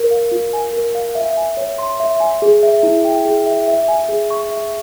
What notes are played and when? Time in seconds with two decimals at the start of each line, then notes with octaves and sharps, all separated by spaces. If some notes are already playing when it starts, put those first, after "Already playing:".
Already playing: A#4
0.11 F5
0.32 F4
0.53 G#5
0.73 A#4
0.95 F5
1.15 E5
1.37 G#5
1.57 C#5
1.78 C6
2.00 E5
2.20 G#5
2.42 G#4
2.63 E5
2.83 E4
3.05 G5
3.25 G#4
3.46 E5
3.68 E5
3.88 G#5
4.09 G#4
4.30 C#6
4.51 E5